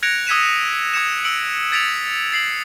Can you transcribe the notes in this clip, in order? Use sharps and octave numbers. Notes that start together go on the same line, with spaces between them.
F#6 G#6 A#6 C#7 D7 F7
D#6 E6 G#6 B6 D#7 E7
D#6 G#6 C#7 E7
E6 C#7 D7 F#7
G#6 A6 B6 C#7 D7 F7
A6 C7 F#7